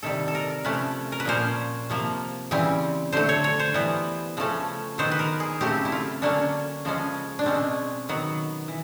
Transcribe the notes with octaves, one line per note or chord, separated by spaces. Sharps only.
C3 D#3 G3 A4
A4
A#4
C3 F3 A3 C#4 B4
A#4
B4
A#2 F3 A#3 C#4 C5
C3 F3 A#3
C#3 E3 G3 C4
D3 F#3 A3 C5
C#5
C#5
C5
E3 G3 B3
C#3 F3 A3 C#4
D#3 F#3 B3 C5
B4
A#4
G#4
C#3 F#3 A3 C4 G4
E4
F4
D3 F#3 A#3 C#4 D4
C#3 F3 G#3 C#4
D4
B2 G#3 C4 C#4
D#3 F#3 B3
E3